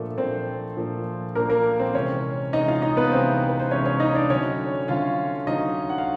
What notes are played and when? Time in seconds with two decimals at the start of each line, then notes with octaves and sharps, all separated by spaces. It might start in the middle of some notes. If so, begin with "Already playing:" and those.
Already playing: A#2 F3 A3 A#3 D4 A4
0.17 A#2 F3 A#3 C4 D4 C5
0.77 A#2 F3 A#3 D4
1.35 A#2 F3 A#3 D4 A#4
1.50 A#3 A#4
1.79 C4 C5
1.94 C3 E3 G#3 C#4 C#5
2.53 C3 E3 G#3 C#4 D#4 D#5
2.68 F4 F5
2.82 D#4 D#5
2.97 B3 B4
3.12 C3 E3 G#3 C4 C#4 C5
3.49 B4
3.60 C5
3.71 C3 E3 G#3 C#4 C#5
3.85 C#4 C#5
4.00 D#4 D#5
4.15 D4 D5
4.30 D3 F#3 A3 C4 C#4 C#5
4.88 D3 F#3 A3 C4 F4 F5
5.47 D3 F#3 A3 C4 D#4 D#5
5.89 F#5
5.98 F5